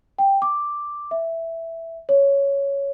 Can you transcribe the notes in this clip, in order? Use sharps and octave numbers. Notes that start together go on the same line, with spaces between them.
G5
D6
E5
C#5